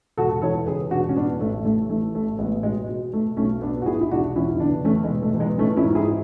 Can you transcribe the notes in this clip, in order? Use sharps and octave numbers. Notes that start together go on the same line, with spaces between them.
E1 F#4 A4
E3 A4 C#5
C#3 G#4 B4
E1 D4 F#4
C#4
E3 B3 D4
A1 A3
A1 A3
E3 A3
A1 A3
A1 G#3 B3
B2 G#3 B3
B2
B2 A3
B1 A3 C#4
B2 B3 D4
F#4
B1 E4 G#4
E4
E1 D4 F#4
E2 C#4 E4
E4
D3 B3 D4
E2 A3 C#4
G#3 B3
E1
A3
E2
G#3 B3
E3 A3 C#4
C#4 E4
G#2
E4 G#4